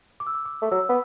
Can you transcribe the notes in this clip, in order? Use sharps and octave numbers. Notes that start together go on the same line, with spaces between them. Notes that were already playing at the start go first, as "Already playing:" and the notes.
D6
E6
D6
D6
A3
F#3 E6
B3